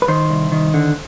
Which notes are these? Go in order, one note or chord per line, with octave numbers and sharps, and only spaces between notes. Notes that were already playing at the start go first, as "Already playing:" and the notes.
B4
D#3 C5
C2
D#3
D3